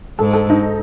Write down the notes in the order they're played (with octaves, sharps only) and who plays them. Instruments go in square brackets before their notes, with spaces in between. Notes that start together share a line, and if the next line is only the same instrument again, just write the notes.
[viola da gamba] G#2 [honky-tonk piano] A4
[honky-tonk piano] A4
D#4